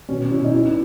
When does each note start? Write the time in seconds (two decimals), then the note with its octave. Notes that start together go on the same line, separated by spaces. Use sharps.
0.09 B2 C#4
0.31 B2 E4
0.44 D#4
0.52 B2 E4